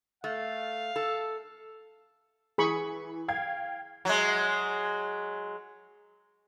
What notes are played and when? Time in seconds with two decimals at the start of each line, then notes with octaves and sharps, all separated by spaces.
0.24 A3 F5
0.96 A4
2.58 E3 G#4 B5 C#6
3.28 F5 G5 G#6
4.05 F#3 G#3